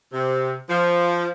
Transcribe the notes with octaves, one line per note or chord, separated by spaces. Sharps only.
C3
F3